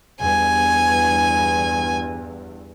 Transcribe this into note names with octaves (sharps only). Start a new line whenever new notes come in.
E2 G2 G#5